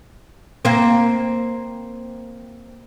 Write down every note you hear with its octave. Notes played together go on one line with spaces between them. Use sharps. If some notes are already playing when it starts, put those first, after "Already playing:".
A#3 C4